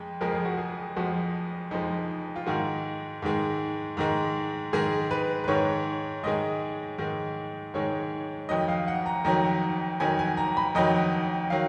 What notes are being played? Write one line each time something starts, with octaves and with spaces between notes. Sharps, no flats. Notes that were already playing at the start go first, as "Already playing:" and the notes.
Already playing: F2 G#3
F2 F3 G#3 A#4
G#4
F#4
G#4
F2 F3 G#3 F#4
F2 F3 G#3 D#4
F4
G#2 D#3 G#3 F#4
G#2 D#3 G#3
G#2 D#3 G#3
G#2 D#3 G#3 G#4
B4
B4
G#2 D#3 G#3 C#5
G#2 D#3 G#3 D#5
G#2 D#3 G#3
G#2 D#3 G#3 C#5
F2 D#3 F#3 D#5
F5
F#5
A#5
F2 D#3 F#3 A#5
F2 D#3 F#3 G#5
G#5
A#5
B5
F2 D#3 F#3 D#5
D#3 F#3 F5